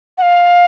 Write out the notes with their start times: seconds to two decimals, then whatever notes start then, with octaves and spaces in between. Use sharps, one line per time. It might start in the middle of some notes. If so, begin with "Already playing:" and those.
0.18 F#5
0.22 F5